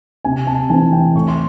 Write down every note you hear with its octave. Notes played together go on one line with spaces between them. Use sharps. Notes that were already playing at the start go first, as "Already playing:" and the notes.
C3 G#5
A5
E3 A3 C4 G#5
G5
A2 C#6
C6